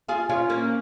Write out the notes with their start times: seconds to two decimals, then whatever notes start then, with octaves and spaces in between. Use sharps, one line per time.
0.08 F4 G#4
0.29 C#4 F4
0.49 A#3 C#4